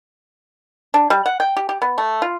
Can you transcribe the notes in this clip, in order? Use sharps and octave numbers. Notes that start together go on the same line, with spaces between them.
D4
G3
F#5
G5
G4
G4
B3
A3
F4